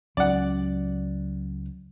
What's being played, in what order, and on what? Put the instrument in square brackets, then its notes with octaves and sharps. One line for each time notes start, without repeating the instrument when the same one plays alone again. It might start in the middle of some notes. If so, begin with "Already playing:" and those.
[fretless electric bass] C#2 F#3 C#4 [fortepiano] D5 F#5